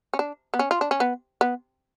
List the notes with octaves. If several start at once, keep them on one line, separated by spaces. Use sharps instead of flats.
C#4
D4
B3
C#4
F4
D4
C#4
B3
B3